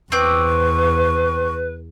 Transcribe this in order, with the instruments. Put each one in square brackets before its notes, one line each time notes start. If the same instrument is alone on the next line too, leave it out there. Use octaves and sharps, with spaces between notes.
[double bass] E2 [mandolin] C4 D6 [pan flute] B4 [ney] C#6